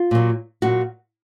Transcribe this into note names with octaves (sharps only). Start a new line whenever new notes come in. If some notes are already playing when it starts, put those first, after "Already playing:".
Already playing: F4
A#2 F#3
A#2 F#3 F#4